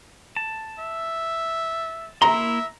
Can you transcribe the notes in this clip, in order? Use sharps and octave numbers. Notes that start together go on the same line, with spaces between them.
A5
E5
A#3 E4 E5 A#5 C6